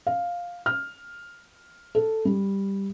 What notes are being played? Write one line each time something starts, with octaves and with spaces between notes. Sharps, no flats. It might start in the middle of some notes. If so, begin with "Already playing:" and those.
F5
F6
A4
G3